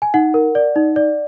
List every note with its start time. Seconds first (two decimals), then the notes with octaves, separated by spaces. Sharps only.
0.02 G#5
0.14 D#4 F#5
0.34 A#4
0.55 D5
0.76 D#4
0.96 D5